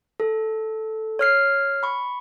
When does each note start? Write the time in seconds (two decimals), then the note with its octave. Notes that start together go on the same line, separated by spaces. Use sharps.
0.20 A4
1.19 C#5 F6 C7
1.83 B5 C#6